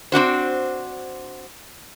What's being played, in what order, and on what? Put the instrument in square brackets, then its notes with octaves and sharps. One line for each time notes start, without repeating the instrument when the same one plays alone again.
[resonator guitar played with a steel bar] C4 D4 F#4 C5